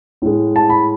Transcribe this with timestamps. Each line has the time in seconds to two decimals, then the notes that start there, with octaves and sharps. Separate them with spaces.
0.22 A2 G#3
0.56 A5
0.70 B5